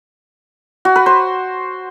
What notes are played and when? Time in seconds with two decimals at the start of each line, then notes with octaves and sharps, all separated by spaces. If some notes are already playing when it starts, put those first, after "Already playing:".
0.85 F#4
0.96 B4
1.06 C5